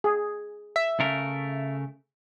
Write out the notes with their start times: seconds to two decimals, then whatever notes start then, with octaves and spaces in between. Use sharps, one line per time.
0.04 G#4
0.76 E5
1.00 C#3 A3 A#4